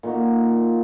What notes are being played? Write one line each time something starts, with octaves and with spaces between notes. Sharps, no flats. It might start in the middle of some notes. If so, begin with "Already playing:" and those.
A#2 A#3 D#4 F#4